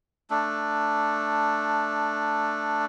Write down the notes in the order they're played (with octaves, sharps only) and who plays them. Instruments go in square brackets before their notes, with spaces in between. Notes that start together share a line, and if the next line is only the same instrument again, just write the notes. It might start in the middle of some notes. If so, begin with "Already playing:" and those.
[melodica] A3 D4